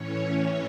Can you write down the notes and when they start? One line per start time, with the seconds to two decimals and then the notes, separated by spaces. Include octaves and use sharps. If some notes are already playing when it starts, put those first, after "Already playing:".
Already playing: A2 E3 C#4 C#5